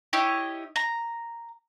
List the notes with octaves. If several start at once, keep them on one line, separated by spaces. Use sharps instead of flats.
E4 G4 C#5 D#5
A#5